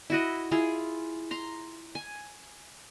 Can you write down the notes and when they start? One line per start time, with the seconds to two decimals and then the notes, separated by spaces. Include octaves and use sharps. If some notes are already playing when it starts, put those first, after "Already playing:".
0.10 E4 F#4 D#5
0.51 E4 F4 G#4
1.31 A#5 C6
1.95 G#5